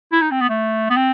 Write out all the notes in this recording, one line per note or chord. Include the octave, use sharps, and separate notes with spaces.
E4
D#4
C4
B3
A3
B3
C4